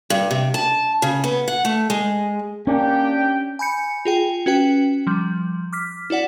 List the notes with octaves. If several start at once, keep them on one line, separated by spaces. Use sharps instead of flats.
G2
C3
A5
C#3
B3
F#5
A3
G#3
A#3 C#4 D4 G4 G5
G#5 B5 G6 C#7
F4 G#4 G5
C#4 F#4 B4 G5
F3 G3
D6 F6 B6
E4 F#4 D5 F#5